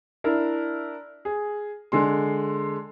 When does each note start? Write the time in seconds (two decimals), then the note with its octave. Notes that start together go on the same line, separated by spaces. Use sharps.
0.24 D4 E4 A#4
1.25 G#4
1.92 D3 G#3 C6